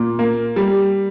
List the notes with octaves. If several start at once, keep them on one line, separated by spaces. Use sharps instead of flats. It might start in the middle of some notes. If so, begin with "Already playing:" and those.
Already playing: A#2
A#3
G3